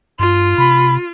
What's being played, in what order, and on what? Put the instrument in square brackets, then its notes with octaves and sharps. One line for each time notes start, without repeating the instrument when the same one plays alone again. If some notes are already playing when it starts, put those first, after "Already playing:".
[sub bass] G2 [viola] F4 [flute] C6
[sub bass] C3 [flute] B5